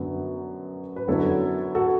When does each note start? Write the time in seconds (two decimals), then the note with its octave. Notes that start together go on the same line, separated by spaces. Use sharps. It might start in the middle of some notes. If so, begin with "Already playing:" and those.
Already playing: F#2 D3 F#3 B3
0.96 B4
1.08 F#2 D3 F#3 B3 E4 A4 C#5
1.75 F#4 A4